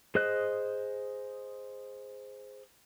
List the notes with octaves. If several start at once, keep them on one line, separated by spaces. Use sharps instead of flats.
G#4 C5 D#5 F#6